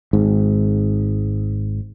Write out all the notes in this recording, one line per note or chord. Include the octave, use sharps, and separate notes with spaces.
G#1 G#2